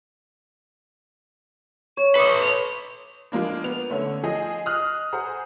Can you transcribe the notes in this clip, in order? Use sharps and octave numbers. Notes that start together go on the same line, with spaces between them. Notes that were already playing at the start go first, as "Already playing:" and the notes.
C#5 E7
B4 C#5 E5 D6 D#6 C#7
F7
F3 G#3 A#3 D4
B3 F7
D3 A3 C#4
F3 G#4 D#5
D#5 D#6 F6 F#6
G#4 C5 F#5 A#5